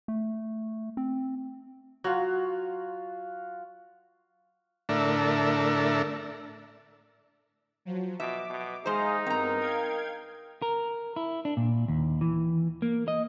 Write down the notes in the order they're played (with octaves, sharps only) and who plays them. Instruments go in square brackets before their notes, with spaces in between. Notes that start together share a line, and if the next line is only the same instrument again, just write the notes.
[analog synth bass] A3
C4
[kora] F#3 [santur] F4 F#4
[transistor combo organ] A2 D3 A3 D4 A#4 E5
[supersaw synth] F3 F#3
[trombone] B2 [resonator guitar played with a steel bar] E5 [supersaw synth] D6
[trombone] B2
[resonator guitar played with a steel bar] G#3 C5 [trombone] D#4 [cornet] G#4 [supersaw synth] D#5 F5 A#5
[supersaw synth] G2 B3 [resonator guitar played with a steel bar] C4 A#5 [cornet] A#4
[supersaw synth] F5 G5 G#6
[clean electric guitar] A#4
E4
D4
A#2
D#2
E3
A#3
D#5